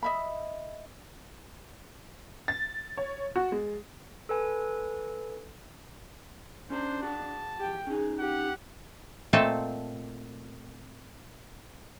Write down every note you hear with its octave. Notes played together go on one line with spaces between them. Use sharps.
D#5 E5 B5
A6
C#5
F#4
G#3
A4 B4 G#5
C#4 D4 G#4 C5 A#5
F#4 G#4 A5
G4 G5
C#4 D#4 G#4
G4 F#5
A#2 A3 C4 A4 D#5 A5